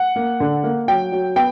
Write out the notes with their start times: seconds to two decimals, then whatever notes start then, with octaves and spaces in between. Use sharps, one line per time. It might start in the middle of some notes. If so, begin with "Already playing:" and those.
Already playing: F#5
0.16 A#3
0.40 D3
0.63 A#3
0.88 F#3 G5
1.12 F#3
1.36 B3 G5